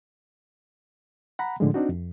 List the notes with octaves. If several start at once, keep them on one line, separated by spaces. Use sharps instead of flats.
F#5 A#5 B5
A2 D3 F3 G#3
C4 D4 D#4 F#4
F2